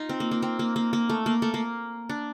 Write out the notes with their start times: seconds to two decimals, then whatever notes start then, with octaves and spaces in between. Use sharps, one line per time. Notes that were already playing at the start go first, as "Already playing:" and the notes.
Already playing: D#4 F4
0.09 C4
0.20 A#3
0.31 A#3
0.42 C4
0.59 A#3
0.76 A#3
0.93 A#3
1.09 A3
1.26 A#3
1.42 A3
1.54 A#3
2.09 D4